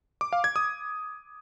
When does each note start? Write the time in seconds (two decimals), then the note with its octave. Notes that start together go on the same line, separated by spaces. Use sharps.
0.21 D6
0.33 F5
0.44 G#6
0.56 D#6